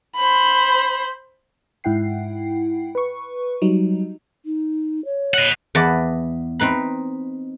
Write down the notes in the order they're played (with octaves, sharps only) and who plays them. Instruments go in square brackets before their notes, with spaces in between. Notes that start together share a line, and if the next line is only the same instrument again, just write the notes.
[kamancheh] C5 B5
[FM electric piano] G#2 E4 F#5 G5 C7
B4 C#6
F#3 G3 D#4
[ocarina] D#4
C#5
[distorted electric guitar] D#5 F#5
[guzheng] E2 B4 D5 D#5 F#5 A5
C4 D#4 B4 B5